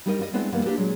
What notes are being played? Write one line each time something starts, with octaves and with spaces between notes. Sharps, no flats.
G3 A3 D#4 A#4 D5 D#5
G3 E4 D#5
G#3 B3 C4 D4 E4
F2 D#3 G3 A#3 B3
A#3 D4 E4 G4 A4 B4
A#2 F#3 G#3